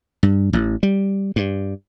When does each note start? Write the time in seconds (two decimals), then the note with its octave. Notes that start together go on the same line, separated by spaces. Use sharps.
0.23 G2
0.53 A1
0.83 G3
1.36 G2